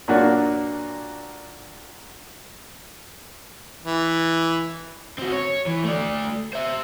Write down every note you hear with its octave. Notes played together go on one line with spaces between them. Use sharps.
A#2 F#3 A#3 D4 F#4
E3
C4 F#4
C#5
E3
A3 D5
C5 E5